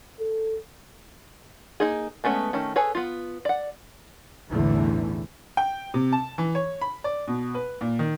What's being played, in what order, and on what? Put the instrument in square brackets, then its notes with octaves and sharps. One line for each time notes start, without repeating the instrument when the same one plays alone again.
[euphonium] A4
[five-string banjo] A#3 D#4 G#4
G#3 A3 B3 C#4
D#3 A3 C#4
G#4 A4 B4 C#5
B3 F4
D5 F#5
[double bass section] B1 E2 A2 D3 E3 A3
[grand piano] G5
C3
A5
E3
C#5
B5
D5
B2
B4
A#2
D#3